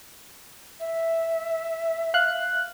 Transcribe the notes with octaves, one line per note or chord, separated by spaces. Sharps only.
E5
F5 F#6